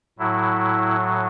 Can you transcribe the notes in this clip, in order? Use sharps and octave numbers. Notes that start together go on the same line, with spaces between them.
A2 F#3 E4